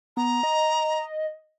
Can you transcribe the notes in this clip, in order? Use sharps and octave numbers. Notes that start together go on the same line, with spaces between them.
B3 A#5
D#5